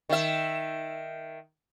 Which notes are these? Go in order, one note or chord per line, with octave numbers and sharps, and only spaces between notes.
D#3 E5